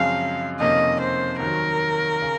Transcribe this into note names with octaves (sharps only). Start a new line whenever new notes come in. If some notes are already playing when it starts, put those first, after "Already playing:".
Already playing: F#2 C#3 F3 G#3 C4 F5
F2 C3 D#3 A#3 C#4 D#5
C5
D#2 D#3 F#3 A#4
C#3